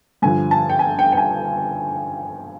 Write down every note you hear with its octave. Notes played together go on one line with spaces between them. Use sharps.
G2 D3 F3 G#5
A5
G5
G#5
G5
G5
G#5